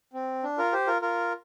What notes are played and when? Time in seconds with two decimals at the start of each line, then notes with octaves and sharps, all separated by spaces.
0.13 C4
0.43 D4
0.58 F4 A#4
0.73 G4 C5
0.87 F4 A#4
1.02 F4 A#4